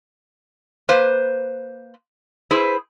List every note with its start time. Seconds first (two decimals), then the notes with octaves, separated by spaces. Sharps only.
0.89 A#3 B4 C5
2.51 E4 G#4 B4 C5